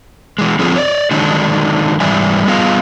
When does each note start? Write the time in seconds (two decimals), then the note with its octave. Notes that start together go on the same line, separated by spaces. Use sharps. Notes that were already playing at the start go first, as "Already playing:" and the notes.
0.38 E3 G#3
0.59 D3 F3 C4 F4 G#4 A4
0.75 C#5 D5
1.11 D3 D#3 F#3 G#3 D4 D#4
2.00 G#2 E3 G3 D5 E5 G#5
2.47 G3 B3 F4 G#4 D#5 F5